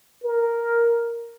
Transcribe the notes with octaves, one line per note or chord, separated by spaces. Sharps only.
A#4